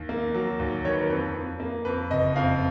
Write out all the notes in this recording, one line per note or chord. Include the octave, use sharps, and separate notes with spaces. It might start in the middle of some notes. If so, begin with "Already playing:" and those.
Already playing: D#2
A#3
F#3
D#2
D#3 C#5
B4
A#4
F2 B4
F2
A#3
F2 B4
F#1 D#5
F2 F5